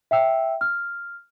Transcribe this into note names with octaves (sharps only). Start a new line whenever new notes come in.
E5 G5 E6
F6